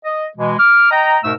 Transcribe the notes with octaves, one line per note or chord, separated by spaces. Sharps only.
D#5
B2 E3 G#3
D6 F6
D#5 G5 A#5
G#2 B2 A3 A#4 E6